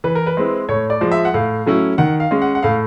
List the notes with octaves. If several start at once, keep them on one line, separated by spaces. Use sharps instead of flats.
E3 B4
A#4
B4
G#3 C4 E4
A2 C#5
D5
F3 G#3
E5
F#5
A2 F5
F#3 A3 C#4 E4
D#3 F#5
F5
G#3 C#4
F#5
F#5
A2 F5